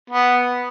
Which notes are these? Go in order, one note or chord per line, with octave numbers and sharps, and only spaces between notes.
B3